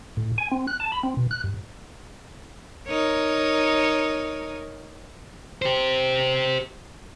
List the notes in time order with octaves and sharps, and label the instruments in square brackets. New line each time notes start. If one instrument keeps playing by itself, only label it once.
[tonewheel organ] A2
G#5
C4
F#6
A5
B5
C4
B2
F#6
G2
[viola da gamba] D#4 A#4 C#5
[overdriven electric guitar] G4 C5